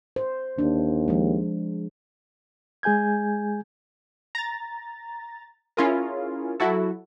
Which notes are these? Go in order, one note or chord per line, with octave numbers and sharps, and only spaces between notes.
C5
D#2 D4
F3 G#3
G#3 G#4 G#5 G6 G#6
A#5 A6
C#4 E4 F4 G#4 A#4
F#3 E4 F#4 A4